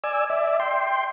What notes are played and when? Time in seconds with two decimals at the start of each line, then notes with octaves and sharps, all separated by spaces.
0.04 D5 G#5 E6
0.30 D5 E5
0.60 G5 C6